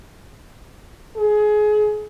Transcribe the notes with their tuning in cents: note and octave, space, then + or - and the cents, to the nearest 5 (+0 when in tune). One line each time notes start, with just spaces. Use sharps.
G#4 +25